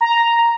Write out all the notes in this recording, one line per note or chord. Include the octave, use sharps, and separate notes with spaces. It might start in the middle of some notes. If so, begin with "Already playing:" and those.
A#5